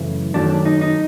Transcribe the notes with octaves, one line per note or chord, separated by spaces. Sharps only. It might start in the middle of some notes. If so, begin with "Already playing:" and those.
Already playing: F#2 C#3 E3 A3
F#2 D#3 F#3 A3 D4
D4
D#4
D#4